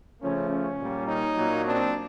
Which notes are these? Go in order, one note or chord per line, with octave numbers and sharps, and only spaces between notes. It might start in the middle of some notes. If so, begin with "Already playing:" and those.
C#3 F3 A3 C#4
C#4
A#2 G3 A#3
C#4 D#4
A#2 F#3 A#3
C4 D4